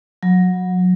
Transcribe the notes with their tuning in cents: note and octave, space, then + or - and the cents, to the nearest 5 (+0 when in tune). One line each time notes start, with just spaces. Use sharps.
F#3 -20